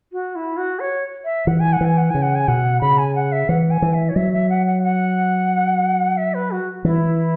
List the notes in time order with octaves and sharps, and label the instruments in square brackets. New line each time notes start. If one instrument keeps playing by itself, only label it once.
[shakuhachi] F#4
E4
F#4
C#5
E5
[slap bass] E3 [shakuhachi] F#5
[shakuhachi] G#5
F#5
[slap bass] E3 [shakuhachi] G#5
[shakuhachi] F#5
[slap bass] C#3 [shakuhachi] G#5
[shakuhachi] F#5
G#5
[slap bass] B2 [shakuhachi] F#5
[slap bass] C#3 [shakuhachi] B5
[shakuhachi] G#5
F#5
E5
[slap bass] E3 [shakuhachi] F#5
[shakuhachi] G#5
[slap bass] E3
[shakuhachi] E5
C#5
[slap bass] F#3 [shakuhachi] E5
[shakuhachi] E5
F#5
F#5
F#5
E5
B4
F#4
[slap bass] E3 [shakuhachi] E4